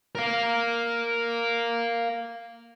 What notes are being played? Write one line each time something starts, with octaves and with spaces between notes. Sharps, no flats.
A#4 F5